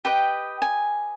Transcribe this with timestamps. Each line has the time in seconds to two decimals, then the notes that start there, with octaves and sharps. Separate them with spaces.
0.05 G4 B4 D#5 G5
0.62 G#5